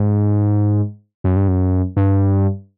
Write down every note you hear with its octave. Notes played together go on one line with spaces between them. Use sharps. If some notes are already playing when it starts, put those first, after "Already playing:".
Already playing: G#2
F#2
G2
F#2
G2